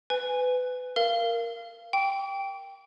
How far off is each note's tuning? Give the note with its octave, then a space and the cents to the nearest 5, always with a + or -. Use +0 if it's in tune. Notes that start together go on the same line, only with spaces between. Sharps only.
B4 +25 G#5 -5
A#4 +0 F5 -20
G5 +0 D6 -45